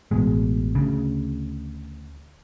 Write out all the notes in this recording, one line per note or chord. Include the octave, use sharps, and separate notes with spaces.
A1 B2 G#3
D2 C#3